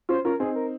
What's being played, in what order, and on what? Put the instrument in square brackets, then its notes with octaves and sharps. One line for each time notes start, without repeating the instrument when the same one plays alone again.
[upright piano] C#4 F4 [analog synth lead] C5
[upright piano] C#4 F4 [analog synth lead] A#4
[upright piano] C4 D#4 [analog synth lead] G#4
[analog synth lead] A#4